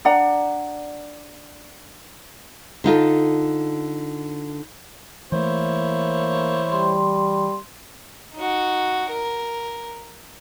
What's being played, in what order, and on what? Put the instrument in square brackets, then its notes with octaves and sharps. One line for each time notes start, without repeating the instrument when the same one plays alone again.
[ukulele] D4 D5 F#5 A#5
[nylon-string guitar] D3 D#4 F4 A4
[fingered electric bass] E3 A3 [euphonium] A#3 [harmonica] E4 C5 C#5
[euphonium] G3 [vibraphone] C6
[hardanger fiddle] D#4 F#4
A#4